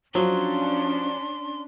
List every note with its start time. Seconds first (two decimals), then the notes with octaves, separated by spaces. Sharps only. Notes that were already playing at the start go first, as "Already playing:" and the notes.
0.15 F3 F#3 C#4 D4 C6